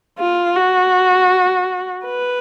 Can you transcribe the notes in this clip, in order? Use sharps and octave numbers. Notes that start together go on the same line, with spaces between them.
F4
F#4
B4